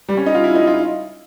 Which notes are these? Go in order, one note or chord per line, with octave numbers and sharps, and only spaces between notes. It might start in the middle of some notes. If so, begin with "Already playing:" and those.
G3
C#4
D#4
F4
E4
D#4
F4